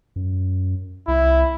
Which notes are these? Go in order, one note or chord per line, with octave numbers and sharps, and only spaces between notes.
F#2
C2 E4